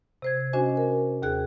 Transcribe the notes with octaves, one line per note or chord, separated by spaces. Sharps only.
C3 C5 G#6
C#4 D4 F#4 C5 D#5 G#5
A#4
D#2 G#4 F#6